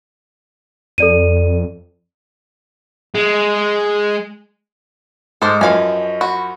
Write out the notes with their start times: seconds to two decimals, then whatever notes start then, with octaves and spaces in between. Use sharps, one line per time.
0.98 F2 A4 D5 D#7
3.15 G#3
5.42 G#2 G#3 A4 C5 D6 D#6 F6
5.61 F#2 E3 F3 C#5 D#5 F5 G#5
6.21 F#4 B5